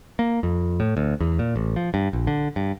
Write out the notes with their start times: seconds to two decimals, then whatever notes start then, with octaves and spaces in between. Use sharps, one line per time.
0.19 A#3
0.43 F2
0.80 A2
0.97 D2
1.20 E2
1.39 A#2
1.56 A1
1.76 F3
1.94 G2
2.13 A#1
2.27 D3
2.56 G2